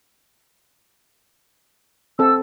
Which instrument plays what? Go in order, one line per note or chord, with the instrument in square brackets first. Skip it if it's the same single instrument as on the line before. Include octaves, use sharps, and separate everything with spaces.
[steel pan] C4 A4 [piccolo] E6